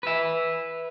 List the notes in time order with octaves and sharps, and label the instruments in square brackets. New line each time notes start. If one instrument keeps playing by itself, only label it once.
[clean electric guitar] B4 E5